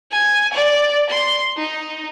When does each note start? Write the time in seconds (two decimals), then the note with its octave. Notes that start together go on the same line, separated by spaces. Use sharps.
0.12 G#5
0.53 D5
1.09 C6
1.57 D#4